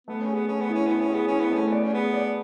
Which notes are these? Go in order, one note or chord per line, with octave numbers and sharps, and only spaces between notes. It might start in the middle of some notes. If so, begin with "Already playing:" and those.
A3 B3
C#4
G#4
B3
A3 C#4
B3
C#4 E4
B3 E4
C#4
B3 G#4
C#4 E4
B3
A3 C#4
B3 D5
C#4
B3 G#4
D5